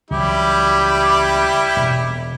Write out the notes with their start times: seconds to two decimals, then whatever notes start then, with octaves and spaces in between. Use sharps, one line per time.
0.10 C#2 E3 F#3 G3 E4 G4
1.76 E1 B2